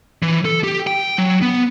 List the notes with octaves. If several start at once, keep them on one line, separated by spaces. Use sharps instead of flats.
E3
A4
G4
G5
F#3
B3